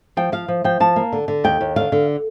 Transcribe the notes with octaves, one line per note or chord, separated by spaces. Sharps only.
F3 G5
F3 F5
F3
F3 G5
F3 A5
A#3
D3
D3
D#2 G5
D#2
D3 F5
D3